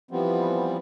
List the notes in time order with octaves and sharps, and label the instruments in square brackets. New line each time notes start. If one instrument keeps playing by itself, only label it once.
[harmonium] E3 F3 G3 B3 C4